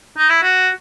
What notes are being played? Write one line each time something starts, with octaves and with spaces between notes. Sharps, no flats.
D#4
E4
F#4